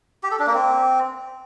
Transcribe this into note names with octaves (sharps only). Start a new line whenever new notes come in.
G4
A4
D4
A#3
C4